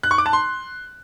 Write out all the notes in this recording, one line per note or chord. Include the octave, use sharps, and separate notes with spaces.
F#6
C#6
D6
A5
C6